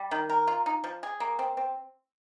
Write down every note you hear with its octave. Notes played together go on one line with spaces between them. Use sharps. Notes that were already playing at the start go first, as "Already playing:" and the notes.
Already playing: G3
D#3
A#4
F4
D#4
F3
G#4
A#3
C4
C4